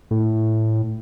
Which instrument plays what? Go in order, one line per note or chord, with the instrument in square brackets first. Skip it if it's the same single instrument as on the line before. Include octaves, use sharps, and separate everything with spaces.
[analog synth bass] A2